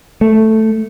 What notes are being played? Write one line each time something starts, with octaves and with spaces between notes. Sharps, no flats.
A3